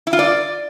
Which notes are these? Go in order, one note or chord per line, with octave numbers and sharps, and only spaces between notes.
E4
F4
D5